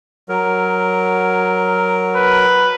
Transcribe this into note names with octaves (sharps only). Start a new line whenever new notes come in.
F#3 A#4
B4